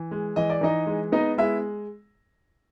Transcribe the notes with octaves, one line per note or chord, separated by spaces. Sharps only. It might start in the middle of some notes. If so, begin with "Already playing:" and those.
Already playing: E3
G#3
E3 D#5
D5
E3 D#4 D#5
G#3
B3 D#4 D#5
G#3 E4 E5